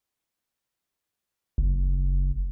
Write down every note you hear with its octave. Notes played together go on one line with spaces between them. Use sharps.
F#1